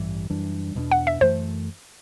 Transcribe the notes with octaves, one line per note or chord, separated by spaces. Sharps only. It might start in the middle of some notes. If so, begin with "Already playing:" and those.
Already playing: A1 G2 E3 G3
F#2 E3 G3 D4
E2 B2 A3 D4
F#5
E5
F#2 E3 A3 C5